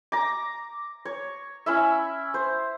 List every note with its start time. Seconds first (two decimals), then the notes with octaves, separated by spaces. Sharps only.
0.12 A#5 D6
1.05 C#5
1.66 C#4 E4 E5
2.34 C5